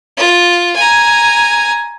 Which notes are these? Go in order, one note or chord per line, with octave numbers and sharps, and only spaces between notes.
F4
G#5 A#5